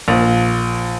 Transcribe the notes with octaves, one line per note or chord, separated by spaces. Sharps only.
A#1